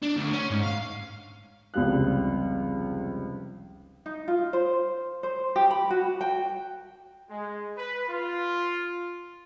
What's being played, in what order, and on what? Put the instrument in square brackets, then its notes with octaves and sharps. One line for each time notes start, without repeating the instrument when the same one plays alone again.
[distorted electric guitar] D4
D2
C#4
G#2
F5
[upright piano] F1 C#2 C3 G3 F5 F#6
[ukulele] D#4
F4
C5
C5
G4
B5
F#4
G5
[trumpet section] G#3
B4
F4